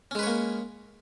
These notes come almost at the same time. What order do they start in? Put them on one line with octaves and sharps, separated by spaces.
C#4 G#3 B4 C#5 A#3